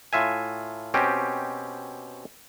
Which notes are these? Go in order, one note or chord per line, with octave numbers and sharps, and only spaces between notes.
A2 F4 E5 G#5
B2 C4 C#4 G4